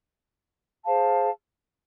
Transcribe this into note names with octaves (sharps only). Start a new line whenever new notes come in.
G#4 C5 F5 A5